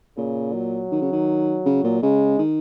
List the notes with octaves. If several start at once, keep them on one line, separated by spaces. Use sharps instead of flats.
A#2 C#3
F#3
D#3
C#3
D#3
C#3
A#2
C#3 G#3
D#3